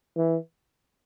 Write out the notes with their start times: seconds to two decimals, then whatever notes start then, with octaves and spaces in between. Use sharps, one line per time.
0.17 E3